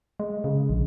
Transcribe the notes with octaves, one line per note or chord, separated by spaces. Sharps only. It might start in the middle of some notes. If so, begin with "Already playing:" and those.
G#3
C#3
A#1